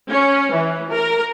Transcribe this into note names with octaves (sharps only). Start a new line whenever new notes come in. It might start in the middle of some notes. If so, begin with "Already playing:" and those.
C#4
E3
A#4